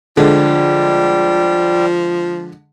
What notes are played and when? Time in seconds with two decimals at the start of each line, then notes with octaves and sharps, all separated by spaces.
0.17 D3 F3 G3 G#3